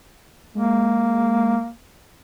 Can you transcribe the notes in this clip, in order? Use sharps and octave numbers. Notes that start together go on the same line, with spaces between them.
G#3 A#3